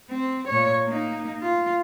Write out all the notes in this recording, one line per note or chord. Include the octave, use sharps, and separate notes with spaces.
C4
A#2 C#5
A#3 D#4
F4